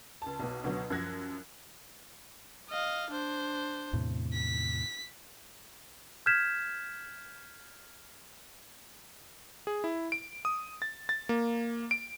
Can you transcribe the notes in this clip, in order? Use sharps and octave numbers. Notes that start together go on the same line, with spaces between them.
C#2 A5
B1 B2
C#2 B2 D3 F#3
F#2 F3 F#6 G#6 A#6
D#5 F5
D4 C5
E2 A2 C3
B6
F6 G6 G#6 B6 E7
G#4
E4
D7
D#6
A6
A6
A#3
D7